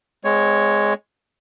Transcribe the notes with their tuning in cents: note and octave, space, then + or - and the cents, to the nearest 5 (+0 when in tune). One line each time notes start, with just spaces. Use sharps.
G#3 +0 C4 -40 C#5 +0